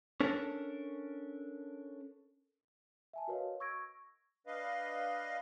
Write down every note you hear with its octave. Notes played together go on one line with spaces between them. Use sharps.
C#4 D4 A4 A#4
E5 G#5 A5
F#4 A#4 B4 C#5 D#5 F5
C#6 E6 G#6 A#6 D7
D4 B4 D#5 F5